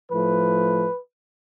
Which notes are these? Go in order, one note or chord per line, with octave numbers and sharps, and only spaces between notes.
A2 F3 A3 B4